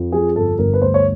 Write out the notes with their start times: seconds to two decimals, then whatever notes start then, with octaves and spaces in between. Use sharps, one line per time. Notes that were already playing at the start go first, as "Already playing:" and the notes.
Already playing: F2
0.12 F3 G#4
0.36 G1 A4
0.58 G1 A#4
0.73 B4
0.82 D2 C5
0.94 C#5